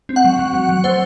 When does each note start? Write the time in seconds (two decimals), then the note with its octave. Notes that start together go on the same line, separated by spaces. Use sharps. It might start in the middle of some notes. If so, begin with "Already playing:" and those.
0.09 C4
0.16 F#5
0.24 F#3
0.39 F#3
0.54 F#3
0.69 F#3
0.84 A3 C5